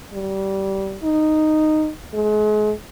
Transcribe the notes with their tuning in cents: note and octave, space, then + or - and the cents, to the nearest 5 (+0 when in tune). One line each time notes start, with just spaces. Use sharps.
G3 -20
D#4 -10
G#3 +35